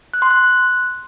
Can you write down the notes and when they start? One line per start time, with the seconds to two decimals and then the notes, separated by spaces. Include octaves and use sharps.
0.14 F#6
0.22 C6
0.31 F#6